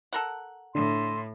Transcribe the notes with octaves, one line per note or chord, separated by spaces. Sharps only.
A4 A#4 F#5
A2 D3 C6